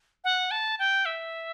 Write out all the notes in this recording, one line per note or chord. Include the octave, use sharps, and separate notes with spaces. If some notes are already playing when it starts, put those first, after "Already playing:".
F#5
A5
G5
E5